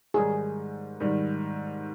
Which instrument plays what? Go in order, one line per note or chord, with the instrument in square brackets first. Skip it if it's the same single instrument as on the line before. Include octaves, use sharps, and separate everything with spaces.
[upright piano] G#2 D#3 G3 [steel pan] G#4
[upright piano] G#2 D#3 G3